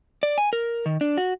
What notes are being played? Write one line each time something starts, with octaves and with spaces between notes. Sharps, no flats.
D5
G#5
A#4
D#3
D4
F#4